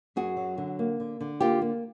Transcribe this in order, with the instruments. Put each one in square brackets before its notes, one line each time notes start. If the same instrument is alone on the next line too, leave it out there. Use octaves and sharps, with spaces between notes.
[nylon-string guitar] F#2 F#4 G#4
F#3
D3
A#3
D3
D3
A#3 F4 G4
A#3